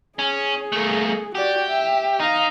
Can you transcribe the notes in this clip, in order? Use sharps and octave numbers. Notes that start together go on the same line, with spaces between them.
C#4 G#4
A3 A#3
F#4 G4 D5
E5
D#4 F5